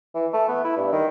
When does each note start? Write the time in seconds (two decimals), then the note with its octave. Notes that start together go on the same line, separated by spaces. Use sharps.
0.14 E3
0.33 A3
0.48 B3
0.64 E4
0.77 G2
0.92 D#3